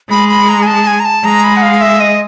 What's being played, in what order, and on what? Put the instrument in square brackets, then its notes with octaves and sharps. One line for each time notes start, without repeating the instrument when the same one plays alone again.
[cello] G#3 [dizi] B5
[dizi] B5
A#5
G#5
A5
G#5
A#5
A5
[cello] G#3 [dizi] A#5
[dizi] B5
F#5
F5
E5
D#5